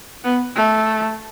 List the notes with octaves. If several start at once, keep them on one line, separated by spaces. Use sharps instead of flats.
B3
A3